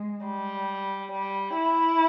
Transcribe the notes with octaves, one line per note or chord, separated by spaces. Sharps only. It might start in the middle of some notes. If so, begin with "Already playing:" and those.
Already playing: G#3
G3
G3
E4